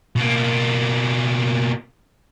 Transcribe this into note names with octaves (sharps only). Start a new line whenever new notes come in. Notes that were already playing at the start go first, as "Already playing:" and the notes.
B2 A#3